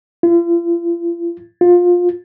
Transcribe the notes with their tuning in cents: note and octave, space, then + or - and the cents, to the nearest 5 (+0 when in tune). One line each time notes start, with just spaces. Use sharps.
F4 -40
F4 +20